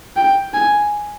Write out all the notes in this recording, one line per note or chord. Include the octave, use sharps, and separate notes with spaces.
G5
G#5